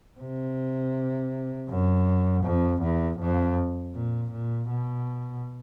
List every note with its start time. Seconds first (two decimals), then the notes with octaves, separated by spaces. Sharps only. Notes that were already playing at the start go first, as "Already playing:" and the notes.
0.20 C3
1.69 F#2
2.44 F2
2.82 E2
3.19 F2
3.94 A#2
4.32 A#2
4.69 B2